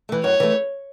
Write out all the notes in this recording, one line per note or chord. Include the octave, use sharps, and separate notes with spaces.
E3 A3
F#2 C#5
E3 A3